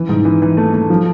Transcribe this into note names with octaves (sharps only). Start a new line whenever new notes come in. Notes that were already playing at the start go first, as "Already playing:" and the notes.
Already playing: E3
G#2
E3
E3
A3
A3
F3